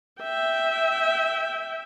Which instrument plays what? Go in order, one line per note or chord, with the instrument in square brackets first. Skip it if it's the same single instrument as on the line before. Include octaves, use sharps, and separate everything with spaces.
[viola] E5 G5